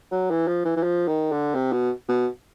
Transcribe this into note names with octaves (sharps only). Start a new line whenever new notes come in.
F#3
E3
F3
E3
E3
F3
D#3
D3
C3
B2
B2